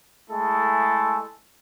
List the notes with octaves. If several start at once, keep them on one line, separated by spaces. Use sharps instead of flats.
G#3 A3 E4 G#4 A4